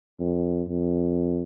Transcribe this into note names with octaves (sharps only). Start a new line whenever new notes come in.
F2
F2